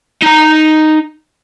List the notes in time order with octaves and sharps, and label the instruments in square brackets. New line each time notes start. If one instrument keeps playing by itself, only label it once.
[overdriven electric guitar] D#4 A#5